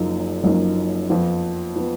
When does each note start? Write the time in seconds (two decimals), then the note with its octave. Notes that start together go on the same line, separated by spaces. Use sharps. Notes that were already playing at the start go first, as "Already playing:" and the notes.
Already playing: F#1 F#2 F3 A#3 D#4
0.43 F#1 F#2 F3 A#3 D#4
1.09 F2 F3 B3
1.76 F3 B3